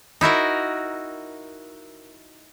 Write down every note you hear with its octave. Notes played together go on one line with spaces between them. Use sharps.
D#4 E4 F#4 A#4